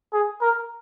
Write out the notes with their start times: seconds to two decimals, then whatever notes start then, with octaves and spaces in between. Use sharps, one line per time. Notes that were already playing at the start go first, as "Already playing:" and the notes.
0.13 G#4
0.41 A#4